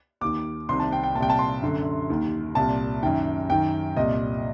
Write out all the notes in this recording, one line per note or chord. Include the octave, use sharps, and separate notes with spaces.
D#2 D#3 D6
C2 C3 D#3 C6
A5
G5
G5
A#2 A5
C2 G5
A5
C6
F#2 D3
D#2 D#3
C2 A#2 A5
F#2 D#3 G5
F#2 D#3 G5
C2 A#2 D#5